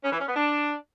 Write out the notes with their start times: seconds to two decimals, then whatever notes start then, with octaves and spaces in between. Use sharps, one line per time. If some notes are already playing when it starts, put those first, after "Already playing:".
0.04 C#4
0.12 E3
0.20 C#4
0.28 B3
0.36 D4